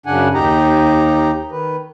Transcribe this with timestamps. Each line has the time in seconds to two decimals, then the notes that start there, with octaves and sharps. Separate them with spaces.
0.06 F#2 C#3 D4 F#5 G#5
0.34 D#2 D#4 G4 A#5
1.51 D#3 B4